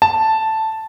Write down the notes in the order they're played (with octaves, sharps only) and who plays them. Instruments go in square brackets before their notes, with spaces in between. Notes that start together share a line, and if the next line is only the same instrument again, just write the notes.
[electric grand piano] A5